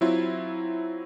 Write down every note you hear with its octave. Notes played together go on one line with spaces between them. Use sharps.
F#3 C4 E4 F4